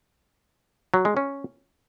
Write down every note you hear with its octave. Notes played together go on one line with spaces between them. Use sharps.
F#3
G#3
C#4